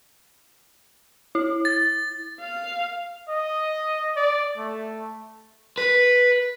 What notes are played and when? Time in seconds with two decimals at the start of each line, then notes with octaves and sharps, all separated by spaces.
1.35 E4
1.65 A6
2.40 F5
3.29 D#5
4.16 D5
4.57 A3
5.78 B4